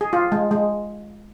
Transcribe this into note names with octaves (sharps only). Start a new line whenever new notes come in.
G#4
F4
G#3
G#3